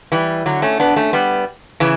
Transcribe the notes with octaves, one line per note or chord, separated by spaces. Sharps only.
E3 G3
D3 F#3
A3 C#4
B3 D4
A3 C#4
G3 B3
C#3 E3